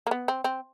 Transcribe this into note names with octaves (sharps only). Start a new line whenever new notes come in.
A#3
B3
C4
C4